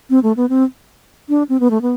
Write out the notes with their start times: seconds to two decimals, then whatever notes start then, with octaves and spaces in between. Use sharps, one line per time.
0.10 C4
0.23 A3
0.37 B3
0.49 C4
1.29 D4
1.49 C4
1.60 B3
1.70 A3
1.82 B3